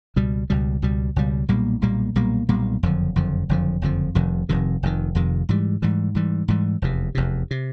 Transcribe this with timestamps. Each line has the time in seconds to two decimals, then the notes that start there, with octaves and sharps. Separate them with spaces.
0.16 C#2 B2 G3
0.50 C#2 B2 G3
0.82 C#2 B2 G3
1.16 C#2 B2 G3
1.48 B1 A#2 G3 A#3
1.82 B1 A#2 G3 A#3
2.16 B1 A#2 G3 A#3
2.49 B1 A#2 G3 A#3
2.83 F#1 F2 D3 F3
3.16 F#1 F2 D3 F3
3.49 F#1 F2 D3 F3
3.82 F#1 F2 D3 F3
4.15 F1 F2 C3 D#3
4.49 F1 F2 C3 D#3
4.83 F1 F2 C3 D#3
5.15 F1 F2 C3 D#3
5.49 G#2 E3 G3
5.82 G#2 E3 G3
6.15 G#2 E3 G3
6.48 G#2 E3 G3
6.82 F1 E2 C3
7.15 F1 E2 C3
7.51 C3